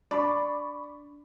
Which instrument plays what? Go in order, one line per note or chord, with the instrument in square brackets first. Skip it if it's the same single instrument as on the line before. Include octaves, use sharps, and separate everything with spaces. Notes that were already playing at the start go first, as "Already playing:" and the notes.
[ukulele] D4 [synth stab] D5 [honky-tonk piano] B5 C#6 D6